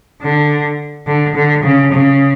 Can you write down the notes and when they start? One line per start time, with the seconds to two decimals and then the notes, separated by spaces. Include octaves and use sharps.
0.23 D3
1.07 D3
1.35 D3
1.63 C#3
1.92 C#3